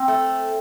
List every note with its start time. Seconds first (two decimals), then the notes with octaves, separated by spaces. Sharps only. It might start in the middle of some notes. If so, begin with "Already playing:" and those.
Already playing: C4
0.08 A3